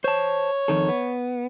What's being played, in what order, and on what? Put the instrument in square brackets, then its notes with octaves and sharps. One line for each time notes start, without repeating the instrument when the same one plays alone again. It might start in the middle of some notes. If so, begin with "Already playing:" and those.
[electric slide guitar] C5 A5 [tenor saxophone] C#5
[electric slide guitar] F2 D#3 A4
B3